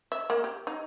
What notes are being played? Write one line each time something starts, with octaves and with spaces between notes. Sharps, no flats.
E5
A#3
G4
D#4